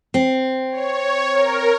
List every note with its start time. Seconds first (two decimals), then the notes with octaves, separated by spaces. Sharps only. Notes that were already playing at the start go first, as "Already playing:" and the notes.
0.14 C4
0.71 C#5
1.32 A#4